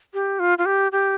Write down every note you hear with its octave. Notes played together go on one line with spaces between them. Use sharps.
G4
F4
F4
G4
G4